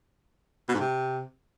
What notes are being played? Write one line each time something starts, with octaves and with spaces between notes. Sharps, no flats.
B2
G#2
C3